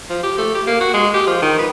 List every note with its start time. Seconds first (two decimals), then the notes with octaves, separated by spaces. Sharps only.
0.10 F3
0.23 G4
0.38 A3
0.55 G4
0.67 A#3
0.80 F#4
0.94 G#3
1.14 G4
1.27 F3
1.42 D#3
1.59 B4